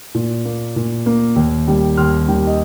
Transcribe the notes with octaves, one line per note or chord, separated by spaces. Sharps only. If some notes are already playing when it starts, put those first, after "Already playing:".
A#2
A#3
A#2
A#3
D#2
D#3 G3
D#2 C6 F6
D#3 G3
D#5